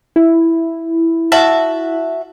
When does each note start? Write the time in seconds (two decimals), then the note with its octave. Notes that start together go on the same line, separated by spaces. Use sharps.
0.16 E4
1.32 F#4 E5 A5